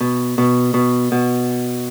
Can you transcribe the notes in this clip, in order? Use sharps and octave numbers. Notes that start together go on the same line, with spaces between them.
B2
B2
B2
B2